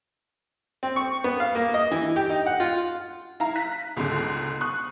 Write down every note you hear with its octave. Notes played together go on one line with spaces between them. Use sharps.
C4
C#6
B3
F5
A#3
D#5
E3
G4
D#4
F#5
F4
E4 F5 A#5
F#6 B6
C#2 G#2 B2 D3
C#6 D#6 F#6